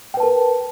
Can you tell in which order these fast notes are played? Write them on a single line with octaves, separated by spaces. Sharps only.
G5 B4 A5 A#4